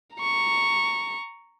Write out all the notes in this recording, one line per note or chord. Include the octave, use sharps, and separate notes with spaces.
A#5 C#6